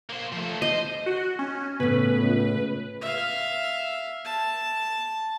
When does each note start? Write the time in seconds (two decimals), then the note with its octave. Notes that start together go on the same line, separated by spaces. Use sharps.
0.10 A#3 C5
0.32 F3 A3
0.62 C5 D#5
1.06 F#4
1.39 C#4
1.80 A2 C#3 B3 B4
2.20 C#2
3.01 E5 F5
4.25 A5